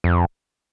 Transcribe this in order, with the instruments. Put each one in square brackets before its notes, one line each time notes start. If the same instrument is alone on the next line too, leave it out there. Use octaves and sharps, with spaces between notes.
[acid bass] F2